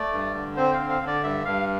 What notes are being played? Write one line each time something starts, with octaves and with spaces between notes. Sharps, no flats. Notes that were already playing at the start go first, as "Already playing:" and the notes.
Already playing: A3 D5
G2
D3
C4 C5
D3 F5
F5
D3
D5
G2 E5
G2 F5